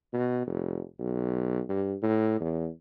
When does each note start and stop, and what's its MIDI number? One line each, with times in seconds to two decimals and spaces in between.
0.13 0.46 47
0.47 0.81 29
0.99 1.61 35
1.69 1.95 43
2.02 2.38 45
2.40 2.69 40